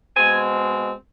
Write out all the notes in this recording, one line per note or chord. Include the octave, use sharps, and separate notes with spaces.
B2 G#3 C4 G#5